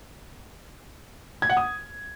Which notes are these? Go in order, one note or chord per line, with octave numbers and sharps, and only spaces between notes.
G#6
F#5
D#6